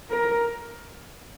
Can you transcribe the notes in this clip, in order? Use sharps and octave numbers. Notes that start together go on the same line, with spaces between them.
A#4